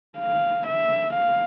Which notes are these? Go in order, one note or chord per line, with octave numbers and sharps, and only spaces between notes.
F5
E5
F5